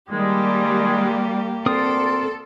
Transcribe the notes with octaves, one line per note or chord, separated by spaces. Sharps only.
D#3 G3 G#3 A#3 G4
D2 C4 A4 A#4 D5 C6 D#6